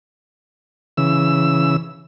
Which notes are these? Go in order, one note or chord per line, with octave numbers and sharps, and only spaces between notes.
C#3 E3 E6